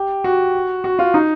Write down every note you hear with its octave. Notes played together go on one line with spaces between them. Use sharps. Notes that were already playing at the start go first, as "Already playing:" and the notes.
Already playing: G4
F#4
F#4
F4
D#4